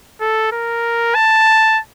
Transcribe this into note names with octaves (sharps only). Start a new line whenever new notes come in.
A4
A#4
A5